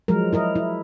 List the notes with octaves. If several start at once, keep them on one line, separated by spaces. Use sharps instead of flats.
F3 F#3 G#3 A#4
E4 A#4 D#5
E4